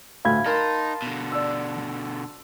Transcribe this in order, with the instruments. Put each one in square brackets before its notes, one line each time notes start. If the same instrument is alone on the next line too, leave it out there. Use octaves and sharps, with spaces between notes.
[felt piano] D2 A2 [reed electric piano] F5 B5 G#6
[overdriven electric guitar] D#4 [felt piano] A#4 [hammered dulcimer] A5 C6
[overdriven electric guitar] B2 D3
[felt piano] D5 E6